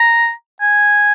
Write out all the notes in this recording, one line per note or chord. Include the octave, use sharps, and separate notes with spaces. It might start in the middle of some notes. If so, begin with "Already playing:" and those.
Already playing: A#5
G#5